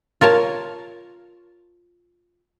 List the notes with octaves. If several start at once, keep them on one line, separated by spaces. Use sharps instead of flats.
F4 A#4 C#5 A5